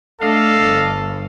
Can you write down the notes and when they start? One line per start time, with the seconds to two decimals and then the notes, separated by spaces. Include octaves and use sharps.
0.21 A3 D4 A4 D5 D#5 F5
0.62 G1